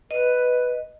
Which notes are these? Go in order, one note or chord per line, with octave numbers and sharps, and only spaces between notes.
B4 D#5